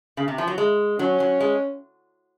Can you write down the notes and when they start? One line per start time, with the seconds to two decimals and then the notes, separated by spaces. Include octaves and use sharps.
0.17 C#3
0.28 C3
0.38 F3
0.47 F#3
0.58 G#3
0.99 F#3 C#4
1.20 F#3
1.40 G#3